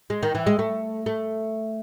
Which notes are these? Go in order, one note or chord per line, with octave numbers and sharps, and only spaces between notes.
G#3
D#3
E3
G#3
A3
A3